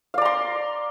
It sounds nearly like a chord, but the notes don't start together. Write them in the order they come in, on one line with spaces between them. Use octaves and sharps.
F5 D5 A#5 C6